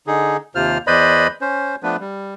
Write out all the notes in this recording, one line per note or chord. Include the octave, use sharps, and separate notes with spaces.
D3 D#4 G#4
D#2 C3 F4 C5 F6
E2 B4 C5 D5 D#5 B5
C#4 C5
F3 A3 B3 D4 B4
G3